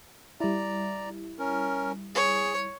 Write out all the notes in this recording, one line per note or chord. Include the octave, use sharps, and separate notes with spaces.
G3 E4 D5 A#5
C#4 A#4
G#4 C#5